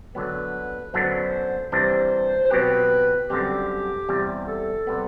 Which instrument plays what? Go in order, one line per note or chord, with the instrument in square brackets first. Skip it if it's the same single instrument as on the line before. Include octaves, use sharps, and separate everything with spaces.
[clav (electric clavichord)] D3 F#3 B3 [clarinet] B4
[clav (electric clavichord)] F#2 D3 F#3 B3 D4 [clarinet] C5
[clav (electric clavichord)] C3 E3 G3 D4 [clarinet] C5
[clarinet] C5
[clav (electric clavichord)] B2 F#3 C4 G4 [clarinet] B4
[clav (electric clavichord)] F#2 D3 G3 C4 [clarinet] G4
[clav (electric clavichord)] E2 C3 G3
[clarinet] A4
[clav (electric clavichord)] C3 G3 B3